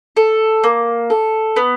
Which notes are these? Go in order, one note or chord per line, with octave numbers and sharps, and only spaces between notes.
A4
A#3
A4
B3